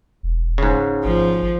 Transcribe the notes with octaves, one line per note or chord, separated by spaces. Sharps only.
E1
G#2 C#3
G#1 F3